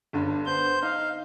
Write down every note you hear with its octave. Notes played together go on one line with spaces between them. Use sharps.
G1 G2 D3
B3 C5 G6
D#4 F5